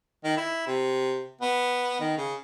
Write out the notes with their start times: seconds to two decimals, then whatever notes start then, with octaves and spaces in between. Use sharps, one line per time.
0.24 D#3
0.37 E4
0.67 C3
1.41 B3
2.00 D#3
2.18 C#3